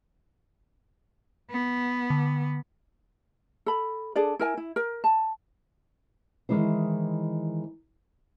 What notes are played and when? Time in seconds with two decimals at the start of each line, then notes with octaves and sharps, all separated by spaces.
1.51 B3
2.10 D3
3.66 A4 B5
4.16 D4 G#4 A4 D5
4.39 E4 A#4 G#5
4.57 E4
4.76 A#4
5.04 A5
6.49 D#3 E3 G#3 E4 C5